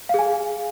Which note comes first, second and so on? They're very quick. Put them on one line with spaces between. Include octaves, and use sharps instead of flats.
F5 G#4 G#5